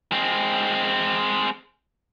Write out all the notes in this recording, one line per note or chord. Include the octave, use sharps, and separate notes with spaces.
G#3 C4